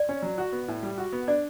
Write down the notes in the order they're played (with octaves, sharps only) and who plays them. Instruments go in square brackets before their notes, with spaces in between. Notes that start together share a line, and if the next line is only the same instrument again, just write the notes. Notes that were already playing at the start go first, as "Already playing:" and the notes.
Already playing: [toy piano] D5
[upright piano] C#4
F#3
F#4
B3
A2
G3
F#4
B3
[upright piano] D4 [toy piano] D5